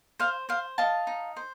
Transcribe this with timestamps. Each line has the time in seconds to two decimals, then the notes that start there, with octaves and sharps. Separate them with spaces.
0.19 C5 F5
0.49 C5 F5
0.78 D#5 F5 A5
1.07 D#4
1.37 C5